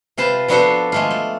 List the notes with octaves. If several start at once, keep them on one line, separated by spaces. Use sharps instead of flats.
C3 F4 B4 C5 A5
F3 B3 D4 F#4 A4 C5
G#3 A3 F4
A3